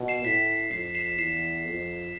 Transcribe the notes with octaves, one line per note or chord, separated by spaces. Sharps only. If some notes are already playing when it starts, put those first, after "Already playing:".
Already playing: B2
C7 E7
A2 B6
F2 C7
C7 E7
E2 C7 E7
F2